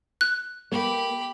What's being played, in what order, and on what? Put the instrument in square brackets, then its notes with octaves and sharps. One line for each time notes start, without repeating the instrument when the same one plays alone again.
[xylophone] F#6
[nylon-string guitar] A#3 [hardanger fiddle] G4 B5